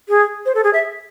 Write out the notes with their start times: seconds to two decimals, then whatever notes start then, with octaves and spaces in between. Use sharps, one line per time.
0.09 G#4
0.46 C5
0.55 A4
0.64 G#4
0.73 E5